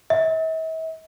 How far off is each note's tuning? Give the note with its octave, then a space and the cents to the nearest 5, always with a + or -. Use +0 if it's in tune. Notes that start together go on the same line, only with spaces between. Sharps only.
E5 -45